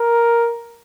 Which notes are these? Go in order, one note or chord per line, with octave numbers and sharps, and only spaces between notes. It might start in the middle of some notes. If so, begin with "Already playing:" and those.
Already playing: A#4